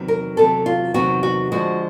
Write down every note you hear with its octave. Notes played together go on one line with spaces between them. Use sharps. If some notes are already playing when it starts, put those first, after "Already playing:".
Already playing: E2 C3 D#3 F#3 B3
A#4
E2 C3 D#3 F#3 B3 A4
F4
E2 C3 D#3 F#3 B3 F#4
F#4
D3 F3 G#3 F#4